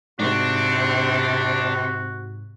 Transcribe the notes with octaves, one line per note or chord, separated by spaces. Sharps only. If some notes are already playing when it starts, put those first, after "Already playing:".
G#2 C3 C4 D4 F#4